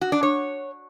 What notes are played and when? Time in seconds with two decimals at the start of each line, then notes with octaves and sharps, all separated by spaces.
0.01 F#4
0.12 D4
0.23 C#5